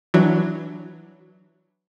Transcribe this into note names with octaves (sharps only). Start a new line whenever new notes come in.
E3 F#3 D4